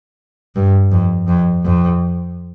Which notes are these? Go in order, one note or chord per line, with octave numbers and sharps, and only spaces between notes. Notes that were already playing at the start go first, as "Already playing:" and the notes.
G2
F2
F2
F2